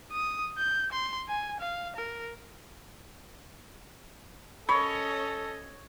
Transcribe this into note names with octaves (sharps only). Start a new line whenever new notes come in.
D#6
G6
C6
G#5
F5
A#4
C#4 A4 C#5 D#5 B5